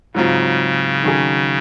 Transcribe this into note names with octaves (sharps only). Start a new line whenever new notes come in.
G#2 C#3 F#3 C4 F4
D#3 F#3 C#4 G#4